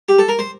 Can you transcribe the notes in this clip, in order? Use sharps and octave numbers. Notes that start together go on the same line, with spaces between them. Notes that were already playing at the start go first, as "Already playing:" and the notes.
G4
A4
A#4
C5